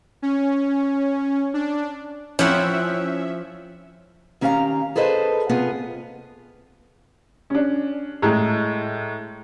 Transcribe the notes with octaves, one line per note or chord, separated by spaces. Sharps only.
C#4
D4
F3 C4 C#4 E4 C#5 E5 F#5
D#3 C#4 G4 D#5 F5 A#5
G#4 A4 B4 C5 D#5
C3 B3 F4 G#4
C#4 D4
A2 G#3 A#5